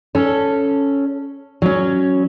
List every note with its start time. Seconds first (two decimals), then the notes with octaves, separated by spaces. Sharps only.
0.15 C#4 A4
1.62 F#3 C#4